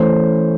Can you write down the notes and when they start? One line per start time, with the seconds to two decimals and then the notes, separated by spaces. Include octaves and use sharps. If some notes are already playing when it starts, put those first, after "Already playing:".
Already playing: E3 A3 C#4 C5